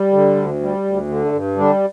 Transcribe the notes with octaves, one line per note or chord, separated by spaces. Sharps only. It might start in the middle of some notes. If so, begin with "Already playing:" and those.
Already playing: G3
D3
D2
G3
D2
D3
A3
G2
D3 G3 D4